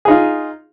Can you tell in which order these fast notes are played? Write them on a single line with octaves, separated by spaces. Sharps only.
G#4 D#4 F4